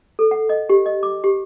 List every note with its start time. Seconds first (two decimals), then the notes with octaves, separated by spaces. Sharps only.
0.19 A4
0.31 F#5
0.49 D#5
0.69 G4
0.86 D#5
1.03 D6
1.24 G4